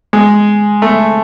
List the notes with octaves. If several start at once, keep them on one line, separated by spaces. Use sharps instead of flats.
G#3
A3